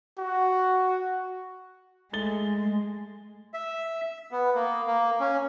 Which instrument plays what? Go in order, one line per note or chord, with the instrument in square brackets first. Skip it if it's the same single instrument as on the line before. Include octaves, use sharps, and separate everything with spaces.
[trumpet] F#4
[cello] G#3 [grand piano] A3 A6 G7
[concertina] E5
B3
A#3
A#3
C#4